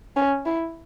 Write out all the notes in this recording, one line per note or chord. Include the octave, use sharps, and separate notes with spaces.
C#4
E4